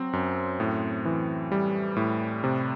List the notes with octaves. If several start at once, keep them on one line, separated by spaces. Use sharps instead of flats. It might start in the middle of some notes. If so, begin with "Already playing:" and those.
Already playing: F#3 C4
F#2
A2
E3
G3
A2
C3